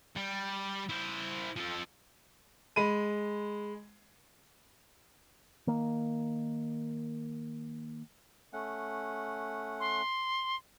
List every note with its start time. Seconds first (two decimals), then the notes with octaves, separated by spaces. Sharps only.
0.16 G3
0.89 E4 C5
1.56 F3 A4
2.76 G#3 B5 D#7
5.67 D#3 A#3
8.53 A3 C#4 F#5
9.80 C6